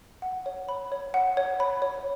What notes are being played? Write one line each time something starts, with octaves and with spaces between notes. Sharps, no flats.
F#5
C#5
B5
C#5
F#5
C#5
B5
C#5